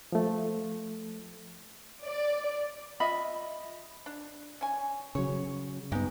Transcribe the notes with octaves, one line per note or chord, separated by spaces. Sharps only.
F3 A3
D5
F4 D#5 E5 B5
D4
C#4 G#5
C#3 F#3 C#5
G2 G#3 B3 D#4 G4